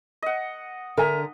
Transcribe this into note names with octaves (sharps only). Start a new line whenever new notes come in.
D#5 F#5
D3 A#4 E5 G#5 A#5